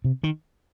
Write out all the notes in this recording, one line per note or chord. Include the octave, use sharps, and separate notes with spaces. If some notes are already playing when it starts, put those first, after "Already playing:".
C3
D#3